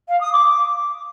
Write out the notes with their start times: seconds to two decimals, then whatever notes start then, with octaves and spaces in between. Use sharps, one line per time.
0.08 F5
0.20 D#6
0.32 D6